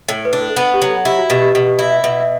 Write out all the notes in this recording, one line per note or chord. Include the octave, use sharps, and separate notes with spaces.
A2 A4
B4
D4
A4
B3 B4
G4
F#3
A4
E4 G4
F#4
B2 G4
G4
B2 G4
G4
E4 E5
E5
B2 E5
E5